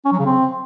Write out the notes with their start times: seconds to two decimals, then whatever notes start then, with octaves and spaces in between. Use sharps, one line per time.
0.05 C#4
0.12 F#3
0.19 C#3
0.26 C4